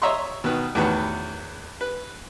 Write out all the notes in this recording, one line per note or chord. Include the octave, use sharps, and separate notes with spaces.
C#5 D#5 E5 A#5 C6 C#6
B2 D#3 B4
E2 A2 D#3 F#4 B4 F#5
B4